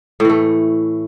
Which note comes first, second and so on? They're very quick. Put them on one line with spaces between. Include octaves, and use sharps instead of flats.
A2 E3 A3